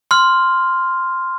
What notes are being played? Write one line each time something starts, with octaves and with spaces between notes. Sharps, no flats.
C6 F6